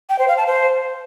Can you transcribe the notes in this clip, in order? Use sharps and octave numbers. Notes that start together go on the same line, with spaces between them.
G5
C5
F5
A5
C5